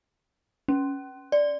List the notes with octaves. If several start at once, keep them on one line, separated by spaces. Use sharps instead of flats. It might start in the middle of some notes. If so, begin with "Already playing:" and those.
C#4
D5